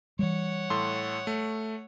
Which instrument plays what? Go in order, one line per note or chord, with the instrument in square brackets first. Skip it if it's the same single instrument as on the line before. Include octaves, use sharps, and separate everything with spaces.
[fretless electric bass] E3 G3 [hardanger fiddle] C#5 F#5
[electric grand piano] A2 A4 C6
A3